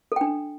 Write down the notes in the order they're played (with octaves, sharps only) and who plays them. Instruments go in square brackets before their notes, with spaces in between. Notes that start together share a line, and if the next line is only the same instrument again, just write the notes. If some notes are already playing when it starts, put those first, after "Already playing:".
[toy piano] A4
G5
D4